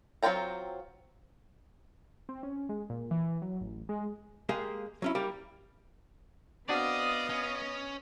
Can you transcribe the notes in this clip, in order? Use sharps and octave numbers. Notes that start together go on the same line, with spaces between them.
F#3 C4 F4 G5 A#5
C4
C#4
G#3
A#2
E3
F#3
A1
G#3
G#3 A#3 G4 G#4
F#3 C#4 E4
G3 A#3 G4
B3 C4 D4 F#4 D5 D#5 F5 D#6
C#4